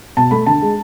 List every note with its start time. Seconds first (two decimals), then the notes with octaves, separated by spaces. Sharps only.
0.17 B2 A5
0.31 A3 B5
0.47 D3 A5
0.62 G#3